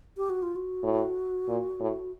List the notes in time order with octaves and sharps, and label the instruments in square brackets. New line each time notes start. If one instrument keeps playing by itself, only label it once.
[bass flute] G4
F#4
F4
F#4
[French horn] A2
A#2
A2